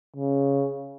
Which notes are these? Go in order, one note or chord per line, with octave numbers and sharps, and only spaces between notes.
C#3